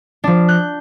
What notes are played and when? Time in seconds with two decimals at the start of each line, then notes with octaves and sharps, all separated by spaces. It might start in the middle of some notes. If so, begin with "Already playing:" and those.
0.24 F3 D4
0.48 F#6 G6